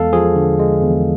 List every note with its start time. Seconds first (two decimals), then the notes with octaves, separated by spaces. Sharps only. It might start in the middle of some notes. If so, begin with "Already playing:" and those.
Already playing: E2 G#3 A4 F5
0.12 F3 G#4
0.36 D3
0.59 G#3
0.83 E2